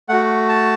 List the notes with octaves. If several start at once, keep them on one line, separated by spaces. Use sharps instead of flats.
A3 F#4 F#5
A5